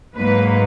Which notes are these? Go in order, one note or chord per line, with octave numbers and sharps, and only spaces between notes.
G#2 F#3 A#3 B4